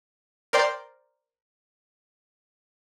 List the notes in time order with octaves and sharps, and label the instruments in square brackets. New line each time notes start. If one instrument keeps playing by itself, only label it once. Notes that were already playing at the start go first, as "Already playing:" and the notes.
[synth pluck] A#4 C5 D5 G5 C6